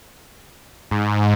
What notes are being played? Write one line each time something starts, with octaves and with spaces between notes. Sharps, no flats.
G#2